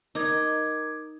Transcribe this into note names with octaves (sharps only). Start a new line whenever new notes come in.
D#4 A#4 D6 G#6